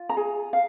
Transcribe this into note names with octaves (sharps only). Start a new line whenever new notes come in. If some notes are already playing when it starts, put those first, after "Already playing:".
Already playing: F4
A#5
G#4 G#5
F5